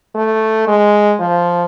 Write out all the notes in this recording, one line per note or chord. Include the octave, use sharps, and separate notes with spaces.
A3
G#3
F3